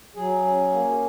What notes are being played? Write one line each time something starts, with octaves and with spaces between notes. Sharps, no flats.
F#3 G#4
C#4
A#3